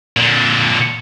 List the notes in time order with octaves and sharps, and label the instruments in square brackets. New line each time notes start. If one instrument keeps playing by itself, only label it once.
[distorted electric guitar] A#2 D3